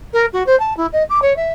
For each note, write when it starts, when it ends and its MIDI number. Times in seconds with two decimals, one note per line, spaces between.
0.13 0.25 70
0.33 0.43 66
0.46 0.57 72
0.59 0.76 81
0.76 0.86 64
0.92 1.03 75
1.09 1.19 86
1.22 1.35 73
1.36 1.52 76